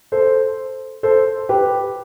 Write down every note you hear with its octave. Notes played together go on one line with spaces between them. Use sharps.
A4 C5
A4 C5
G4 B4